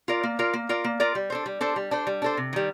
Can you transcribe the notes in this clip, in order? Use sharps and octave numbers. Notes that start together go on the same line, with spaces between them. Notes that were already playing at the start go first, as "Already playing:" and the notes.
F4 A#4 D5
A#3
F4 A#4 D5
A#3
F4 A#4 D5
A#3
F4 A#4 D5
G3
D4 A4 C5
G3
D4 A4 C5
G3
D4 A4 C5
G3
D4 A4 C5
C3
D#3 G3